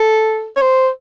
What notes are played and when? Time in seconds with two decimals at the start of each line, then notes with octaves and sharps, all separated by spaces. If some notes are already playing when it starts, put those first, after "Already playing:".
Already playing: A4
0.56 C#5
0.62 C5